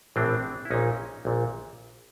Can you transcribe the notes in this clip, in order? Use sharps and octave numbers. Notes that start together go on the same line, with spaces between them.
A#1 A2 E3 C4 D4
E4
A#1 A#2 C#4 D#4
A#1 A#2